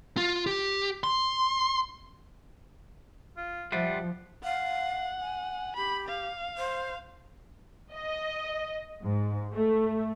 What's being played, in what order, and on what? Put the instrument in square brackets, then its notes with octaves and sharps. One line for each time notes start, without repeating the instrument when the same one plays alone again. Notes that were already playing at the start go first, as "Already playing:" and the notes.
[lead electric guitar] F4
G4
C6
[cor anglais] F4
[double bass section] F3 [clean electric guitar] G3 F4 [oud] G4 C5 E5 [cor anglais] F#5
[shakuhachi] F5 [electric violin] F#5
[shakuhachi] G#5
[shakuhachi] G4 [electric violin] B5
[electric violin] F5
[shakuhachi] C5
[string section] D#5
G#2
A3